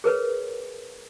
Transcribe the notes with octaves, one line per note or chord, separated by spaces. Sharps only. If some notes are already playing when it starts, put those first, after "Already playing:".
G#4 A#4 B4 C#5